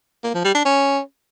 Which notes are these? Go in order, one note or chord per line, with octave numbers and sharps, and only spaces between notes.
A#3
F3
G3
D4
C#4